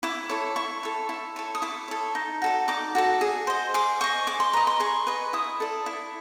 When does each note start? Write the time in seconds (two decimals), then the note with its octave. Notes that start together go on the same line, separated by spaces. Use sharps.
0.03 E4 D6
0.29 A4 C#5
0.56 E4 C#6
0.83 A4 C#5
1.09 E4
1.36 A4 C#5
1.55 D#6
1.62 E4 D6
1.88 A4 C#5
2.15 D#4
2.42 F#4 A4 D5
2.68 D#4 D6
2.95 F#4 A4 D5
3.21 G#4
3.47 C5 D#5
3.74 G#4 D6
4.01 C5 D#5 C#6
4.27 G#4 D6
4.40 C6
4.53 B4 D#5 A#5
4.67 C6
4.80 G#4 C#6
5.07 B4 D#5
5.33 E4 D#6
5.60 A4 D5
5.86 E4